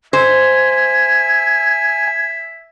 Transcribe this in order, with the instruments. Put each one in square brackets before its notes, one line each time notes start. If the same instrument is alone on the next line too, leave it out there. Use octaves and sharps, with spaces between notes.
[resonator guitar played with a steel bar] C5 [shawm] E5 [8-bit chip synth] G#5 [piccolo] G#6